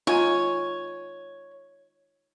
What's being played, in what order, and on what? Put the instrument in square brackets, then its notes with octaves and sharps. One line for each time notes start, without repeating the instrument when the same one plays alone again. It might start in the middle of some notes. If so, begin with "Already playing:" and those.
[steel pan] D#4 F4 G#5 [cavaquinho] C#5